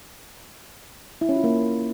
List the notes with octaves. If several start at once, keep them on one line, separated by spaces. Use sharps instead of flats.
E4
C#4
F4
A#3